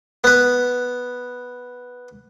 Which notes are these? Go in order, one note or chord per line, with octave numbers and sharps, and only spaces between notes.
B3 B4